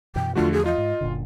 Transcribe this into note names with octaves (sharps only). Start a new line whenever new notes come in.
F#2 B2 E3 G5
E2 D3 F3 A3 F4 F#4
G#4
F4 D#5
G#2
F#1 A#2 D3